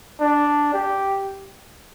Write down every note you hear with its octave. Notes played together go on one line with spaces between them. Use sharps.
D4
G4